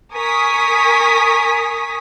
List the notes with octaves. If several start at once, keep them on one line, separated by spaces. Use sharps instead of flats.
A#4 G#5 C#6 D#6 B6